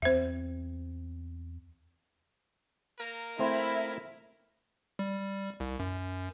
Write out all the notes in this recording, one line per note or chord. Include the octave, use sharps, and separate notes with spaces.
E2 C4 C5 E5
A#3 A#4
A3 C4 E4 C5
G3
C2
F#2